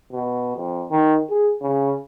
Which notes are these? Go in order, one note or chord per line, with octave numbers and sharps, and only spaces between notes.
B2
F2
D#3
G#4
C#3